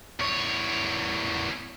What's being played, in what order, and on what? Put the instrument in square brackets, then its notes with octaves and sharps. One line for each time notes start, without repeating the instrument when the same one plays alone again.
[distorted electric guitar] E2 C#5